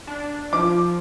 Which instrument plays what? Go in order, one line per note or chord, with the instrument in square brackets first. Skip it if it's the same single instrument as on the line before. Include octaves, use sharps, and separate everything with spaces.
[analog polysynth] D4
[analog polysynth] F3 [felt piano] D6